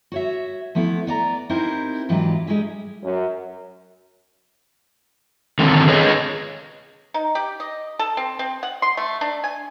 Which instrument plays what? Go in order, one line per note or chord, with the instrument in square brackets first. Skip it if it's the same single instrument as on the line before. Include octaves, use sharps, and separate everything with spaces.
[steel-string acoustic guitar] F#4 C#5 E5
F3 A3 B3 E4
B3 D5 A#5
C4 D#4 E4 G4 A#4 C5
G#2 E3 F#3 D4 F4 G4
G3 G#3 F#4 G#4 E5
[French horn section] F#2
[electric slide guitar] D3 D#3 B3 C4 A4
G#4 B4 C#5 D#5
[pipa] D#4
G4
D#5
A4
C4
C4
F#5
C6
A3
D4
G#5